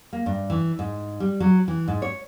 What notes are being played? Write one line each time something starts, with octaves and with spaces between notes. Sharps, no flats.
A#3
G2
E3
G#2
G3
F#3
E3
G#2
C#5